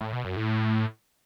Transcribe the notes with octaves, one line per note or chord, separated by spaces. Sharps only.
A2
B2
F#2
A2